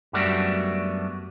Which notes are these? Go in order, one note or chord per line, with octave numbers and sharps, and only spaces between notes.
F#2 G3 A3 B3 D4 F#4